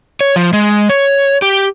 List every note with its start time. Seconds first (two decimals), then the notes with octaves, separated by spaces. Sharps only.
0.21 C#5
0.36 F3
0.53 G#3
0.89 C#5
1.42 G4